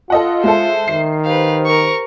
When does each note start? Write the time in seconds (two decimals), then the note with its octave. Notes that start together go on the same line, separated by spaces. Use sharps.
0.10 F4 A4 D#5 F#5
0.44 G#3 A4 C5 E5
0.88 D#3 C7
1.25 G4 B4 C5 F5
1.66 A#4 C#6